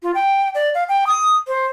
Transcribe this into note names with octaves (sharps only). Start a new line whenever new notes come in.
F4
G5
D5
F5
G5
D#6
C5